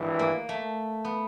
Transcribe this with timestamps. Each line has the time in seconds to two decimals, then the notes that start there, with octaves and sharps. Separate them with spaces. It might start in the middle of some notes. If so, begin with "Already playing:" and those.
Already playing: G#1 G2 E3
0.19 A#3
0.49 A3
1.05 B3